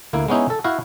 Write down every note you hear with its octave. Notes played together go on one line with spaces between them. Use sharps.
D2 A#3 E4
G#3 B3 C#4 D#4 E4
A4
E4 F#4 F5